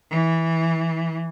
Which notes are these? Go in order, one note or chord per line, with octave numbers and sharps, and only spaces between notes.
E3